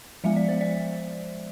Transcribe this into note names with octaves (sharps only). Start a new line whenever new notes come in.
F3 G#3 B3 E5
D5
C5
D5